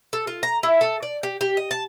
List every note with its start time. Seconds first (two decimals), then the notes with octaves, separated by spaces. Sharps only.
0.13 A4
0.27 F4
0.43 A#5
0.63 E4
0.81 A4
1.03 D5
1.23 G4
1.41 G4
1.57 D#5
1.71 A5